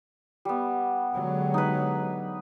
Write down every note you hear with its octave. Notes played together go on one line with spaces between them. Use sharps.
G3 B3
D3 F#3 G#3
D#4 B4